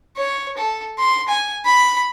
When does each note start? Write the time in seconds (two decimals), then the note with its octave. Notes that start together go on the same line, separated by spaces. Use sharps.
0.17 C#5
0.57 A4
0.99 C6
1.28 G#5
1.65 B5